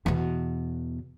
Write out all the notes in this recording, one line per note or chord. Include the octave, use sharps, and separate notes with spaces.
E2 B2